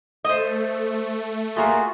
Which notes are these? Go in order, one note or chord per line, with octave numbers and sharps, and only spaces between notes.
A3 C5 D#5
A3 A#3 F4 F#4 G#4